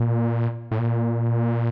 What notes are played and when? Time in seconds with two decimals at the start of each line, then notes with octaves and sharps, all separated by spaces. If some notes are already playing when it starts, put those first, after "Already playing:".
Already playing: A#2
0.71 A2
0.79 A#2